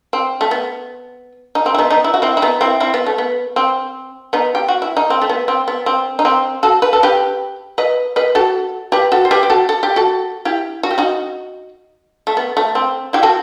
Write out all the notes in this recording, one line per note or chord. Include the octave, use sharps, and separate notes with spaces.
C4
A3
B3
D#4
C4
E4
B3 D#4
B3 D#4
E4
F#4
C4 E4
E4
B3 D#4
C4 E4
C4 E4
B3
A3
B3
C4
B3 D#4
G4
F#4
E4
D#4
C4
A3
B3
C4
B3
C4
D#4
C4
F#4 A4
B4
A4
G4 B4
B4 D#5
B4 D#5
F#4 A4
G4 B4
F#4 A4
C5
G4 B4
G4
F#4 A4
A4
G4
F#4 A4
E4 G4
F#4
G4
D#4 F#4
A3
B3
A3
C4
E4 G4
F#4 A4